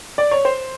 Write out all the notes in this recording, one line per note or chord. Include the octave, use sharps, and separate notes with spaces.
D5
C#5
C5